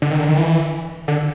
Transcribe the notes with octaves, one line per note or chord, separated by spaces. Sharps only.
D3
D#3
D3
D#3
E3
D3